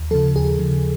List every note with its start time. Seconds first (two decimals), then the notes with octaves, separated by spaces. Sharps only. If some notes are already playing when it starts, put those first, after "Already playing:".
Already playing: D#2
0.11 C#3 F3 A4
0.36 D#2 G#4
0.59 C#3 F3